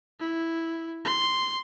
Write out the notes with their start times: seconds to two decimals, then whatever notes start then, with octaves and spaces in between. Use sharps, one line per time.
0.20 E4
1.05 C6